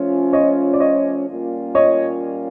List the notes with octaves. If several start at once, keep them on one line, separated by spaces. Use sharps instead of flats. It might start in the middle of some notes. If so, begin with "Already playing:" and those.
Already playing: F3 A3 C#4 F4
C#5 D#5
D5
C#5 D#5
A#2 G3 A#3 C#4 F4
C#5 D#5